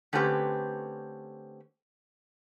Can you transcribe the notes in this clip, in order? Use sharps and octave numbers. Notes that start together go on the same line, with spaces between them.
D3 A3 C4 C#4 G4 B4